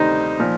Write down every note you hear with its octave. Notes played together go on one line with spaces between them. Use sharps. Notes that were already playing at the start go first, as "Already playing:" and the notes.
Already playing: D2 C3 D#3 G3 D#4 C5
A#2 F3